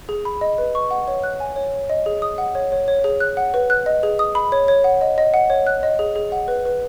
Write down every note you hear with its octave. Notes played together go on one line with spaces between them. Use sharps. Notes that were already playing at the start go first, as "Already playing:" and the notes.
G#4
B5
D#5
B4
C#6
F#5
C#5
F#6
G#5
C#5
C#5
D#5
G#4
D#6
F#5
C#5
C#5
C#5
G#4
F#6
F#5
B4
F#6
D#5
G#4
D#6
B5
C#5
C#5
F#5
D#5
D#5
F#5
C#5
F#6
D#5
G#4
G#4
F#5
B4
B4